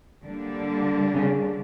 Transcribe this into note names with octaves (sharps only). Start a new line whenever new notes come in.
D3 G3 A#3 D4
C#3